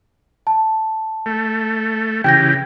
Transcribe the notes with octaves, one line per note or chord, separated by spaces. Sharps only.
A5
A3
C#3 E3 G4 G5 G6 A#6